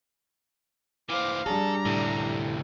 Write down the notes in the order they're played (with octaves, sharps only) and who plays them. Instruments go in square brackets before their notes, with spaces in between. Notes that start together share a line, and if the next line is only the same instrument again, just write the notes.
[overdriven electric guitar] E3 C4 [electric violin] F5 D6
[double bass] G3 D4 [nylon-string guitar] G#4 [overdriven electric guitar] A4 [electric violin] A#5
[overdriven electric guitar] D2 C3 [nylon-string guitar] A2